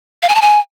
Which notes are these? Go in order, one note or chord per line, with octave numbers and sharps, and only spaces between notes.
F5
G#5
A5
G#5